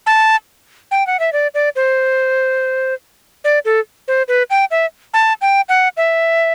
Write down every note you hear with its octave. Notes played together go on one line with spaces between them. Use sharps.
A5
G5
F#5
E5
D5
D5
C5
D5
A4
C5
B4
G5
E5
A5
G5
F#5
E5